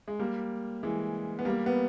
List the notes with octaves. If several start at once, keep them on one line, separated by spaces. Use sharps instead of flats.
G#3
G3 A#3
E3 G#3
B3
G3 A#3
B3